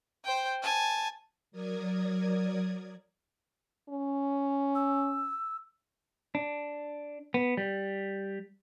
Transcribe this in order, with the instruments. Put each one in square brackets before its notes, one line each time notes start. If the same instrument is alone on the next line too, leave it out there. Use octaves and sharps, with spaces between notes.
[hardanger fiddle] C5 G5
G#5 A5
[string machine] F#3 A#4 D5 D#6 G#6
[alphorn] C#4
[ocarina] E6
[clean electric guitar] D4
B3
G3